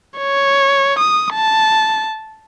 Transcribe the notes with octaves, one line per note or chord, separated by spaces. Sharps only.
C#5
D#6
A5